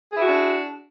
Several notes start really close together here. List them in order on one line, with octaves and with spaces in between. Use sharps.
G#4 E4 F#4 D4